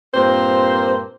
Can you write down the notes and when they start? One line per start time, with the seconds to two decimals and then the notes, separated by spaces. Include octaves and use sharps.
0.14 G2 A#2 A#3 C4 C5